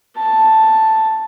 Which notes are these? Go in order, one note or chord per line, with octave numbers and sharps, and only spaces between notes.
A5